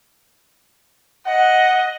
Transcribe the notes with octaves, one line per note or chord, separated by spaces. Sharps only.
D#5 F#5